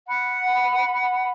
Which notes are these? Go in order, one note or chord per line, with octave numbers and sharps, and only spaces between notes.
F#5 B5